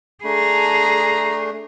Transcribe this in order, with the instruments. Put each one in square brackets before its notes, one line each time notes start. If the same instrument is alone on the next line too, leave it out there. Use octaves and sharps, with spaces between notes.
[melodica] A3 D4 [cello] G#4 [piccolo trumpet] A#5